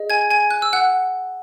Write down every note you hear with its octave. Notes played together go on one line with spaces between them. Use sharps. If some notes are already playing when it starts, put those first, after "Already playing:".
Already playing: G#4 D#5
G#5 G#6
G#5 G#6
F#6
E6
F#5 F#6